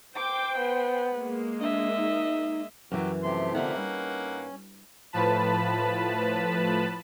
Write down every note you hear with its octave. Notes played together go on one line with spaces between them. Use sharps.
C5 G5 D6
B3
G#3 A#3
D4 D#5 E5
D#4
F#2 E3 F#3 F#4 G4
C3 F3 A3 G4 C6
D3 A#3 B3 D#4 F4 F#5
G2 C#4
A2 F3 B4 A5 B5